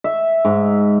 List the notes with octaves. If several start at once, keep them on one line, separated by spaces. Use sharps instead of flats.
E5
G#2